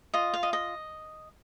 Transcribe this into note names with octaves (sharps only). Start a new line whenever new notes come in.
F4 D#5
F5
D#5
D#5